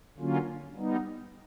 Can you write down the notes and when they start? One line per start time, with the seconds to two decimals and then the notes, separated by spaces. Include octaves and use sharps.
0.18 D3 F#3 A#3 C#4 F4
0.76 G3 B3 D#4